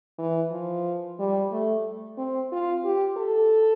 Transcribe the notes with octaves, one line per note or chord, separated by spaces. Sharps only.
E3
F3
G3
A3
C4
F4
G4
A4